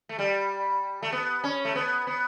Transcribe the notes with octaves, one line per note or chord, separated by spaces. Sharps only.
A3
G3
A3
B3
C#4
A3
B3
B3